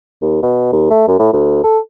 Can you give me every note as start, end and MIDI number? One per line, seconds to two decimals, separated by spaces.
0.22 0.40 39
0.43 0.70 47
0.73 0.86 39
0.90 1.07 57
1.08 1.18 42
1.19 1.33 45
1.33 1.60 38
1.64 1.79 69